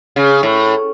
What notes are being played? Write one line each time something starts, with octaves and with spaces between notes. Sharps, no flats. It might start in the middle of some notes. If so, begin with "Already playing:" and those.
C#3
A2